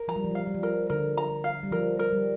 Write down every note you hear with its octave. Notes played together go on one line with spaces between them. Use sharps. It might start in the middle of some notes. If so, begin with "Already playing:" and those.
Already playing: A#4
F3 A#5
G3
F3
G3
F3 F5
G3
F3
A#4
D3 A#4
A#5
F5
G3
F3 A#4
A#4
G3